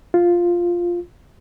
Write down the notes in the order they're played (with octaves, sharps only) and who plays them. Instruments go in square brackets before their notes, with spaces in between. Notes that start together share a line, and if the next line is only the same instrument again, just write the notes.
[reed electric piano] F4